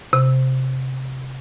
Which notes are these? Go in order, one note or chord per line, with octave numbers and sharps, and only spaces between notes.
C3